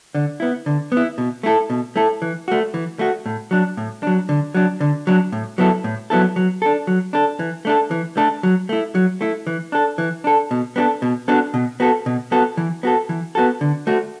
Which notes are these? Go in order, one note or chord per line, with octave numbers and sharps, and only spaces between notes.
D3
B3 E4
D3
B3
E4
B2
A3 E4 A4
B2
A3 E4 A4
E3
A3 F#4
E3
A3 F#4
A2
F#3 D4
A2
F#3 D4
D3
F#3 D4
D3
F#3 D4
A2
F#3 B3 E4 A4
A2
F#3 B3 E4 A4
F#3
D4 A4
F#3
D4 A4
E3
A3 D4 A4
E3
A3 D4 A4
F#3
A3 E4
F#3
A3 E4
E3
D4 A4
E3
D4 A4
B2
B3 D4 F#4 A4
B2
B3 D4 F#4 A4
B2
B3 F#4 A4
B2
B3 F#4 A4
E3
B3 F#4 A4
E3
B3 F#4 A4
D3
A3 F#4